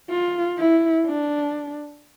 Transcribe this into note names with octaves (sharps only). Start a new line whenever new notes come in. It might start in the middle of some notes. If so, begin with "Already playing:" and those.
F4
E4
D4